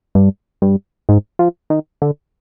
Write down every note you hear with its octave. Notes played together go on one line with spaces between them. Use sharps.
G2
G2
G#2
F3
D#3
D3